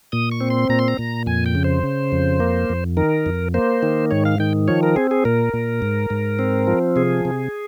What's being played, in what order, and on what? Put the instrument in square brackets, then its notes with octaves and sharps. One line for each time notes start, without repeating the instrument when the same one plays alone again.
[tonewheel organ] A#2 D#6
C#6
C4
C6
A#2 A#5
C6
A#5
A#2
F2 G#5
G5
C#3
C5
C#3
F2
A#3
F2
D#3 A#4
F2
A#3 C5
D#3
G#2 C#5
F5
D#3 G5
F3 C#5
A#4
C4 G#4
G#4
A#2 A#4
A#2
G#2
G#2
C4
F3
C3 G#4
C3